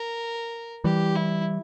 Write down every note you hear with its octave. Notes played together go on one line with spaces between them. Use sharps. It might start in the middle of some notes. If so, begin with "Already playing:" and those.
Already playing: A#4
E3 G3 G4
E4